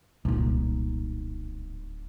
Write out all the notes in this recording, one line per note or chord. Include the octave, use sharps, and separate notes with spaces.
D1 C2 A#2 D#4